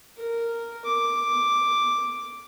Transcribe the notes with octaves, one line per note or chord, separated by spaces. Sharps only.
A#4
D6